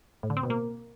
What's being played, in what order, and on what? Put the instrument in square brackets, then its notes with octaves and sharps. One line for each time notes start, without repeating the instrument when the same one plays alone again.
[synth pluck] A2
D3
C4
B2
A#3